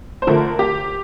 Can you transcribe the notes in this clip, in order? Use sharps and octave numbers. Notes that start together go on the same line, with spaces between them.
C5
D3 F3 A3 A#4
G4